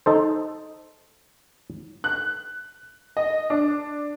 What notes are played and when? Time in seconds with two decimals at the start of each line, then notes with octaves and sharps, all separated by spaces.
0.06 D#4 A4 C5
2.04 F#6
3.17 D#5
3.50 D4